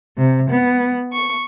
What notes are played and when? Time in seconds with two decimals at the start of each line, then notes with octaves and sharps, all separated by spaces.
0.18 C3
0.51 B3
1.13 C#6